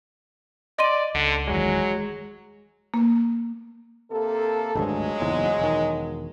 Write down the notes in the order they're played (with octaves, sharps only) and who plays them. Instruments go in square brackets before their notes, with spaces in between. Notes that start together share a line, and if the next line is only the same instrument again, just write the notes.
[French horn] D5 [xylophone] D#5 C6 D#7
[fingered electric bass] C#2 [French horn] D3
[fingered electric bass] F#1 E2 D#3 [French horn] F#3 [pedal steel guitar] G#3
[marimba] A#3
[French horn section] C3 A#3 A4
[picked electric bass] G#1 D2 G2 [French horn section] F3 F#3 G#3
[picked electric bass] F#1 E2 G#2
E1 D#3